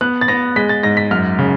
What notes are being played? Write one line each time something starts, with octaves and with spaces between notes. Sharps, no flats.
B3 F#6
A6
B3 A#6
G#3 B6
A6
G#2 A#6
B6
F#2 F6
C#3